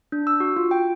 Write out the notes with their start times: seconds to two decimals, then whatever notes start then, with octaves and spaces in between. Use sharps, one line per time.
0.12 D4
0.27 E6
0.40 F#4
0.56 F4
0.71 G5